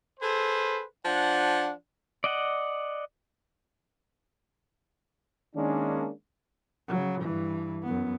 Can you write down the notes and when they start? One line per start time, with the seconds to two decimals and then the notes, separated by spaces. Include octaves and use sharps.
0.20 G#4 A4 B4 C5
1.05 F3 D4 F#5
2.24 D5 D#5 F#5
5.55 D#3 G#3 A#3 C#4 D4
6.88 C#3 F#3
7.21 G2 E3
7.83 F#2 B3